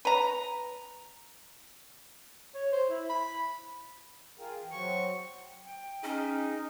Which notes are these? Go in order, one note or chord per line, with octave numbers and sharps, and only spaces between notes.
B4 A#5
C#5
C5
E4
B5
F4 G#4 A#4 G5
E3
F#3 C4 F#4 C#6
G5
C#4 D#4 G#4